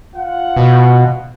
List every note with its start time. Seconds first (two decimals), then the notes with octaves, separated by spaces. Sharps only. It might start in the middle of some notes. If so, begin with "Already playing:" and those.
0.15 F4 F#5
0.57 B2